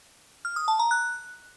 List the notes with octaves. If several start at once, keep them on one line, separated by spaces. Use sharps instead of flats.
F6
D#6
A5
A#5
F#6